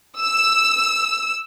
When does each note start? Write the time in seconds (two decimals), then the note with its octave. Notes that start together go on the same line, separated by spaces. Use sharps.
0.20 E6